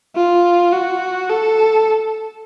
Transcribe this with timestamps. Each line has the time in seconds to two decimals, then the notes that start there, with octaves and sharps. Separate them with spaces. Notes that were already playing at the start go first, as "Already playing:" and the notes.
0.16 F4
0.73 F#4
1.29 A4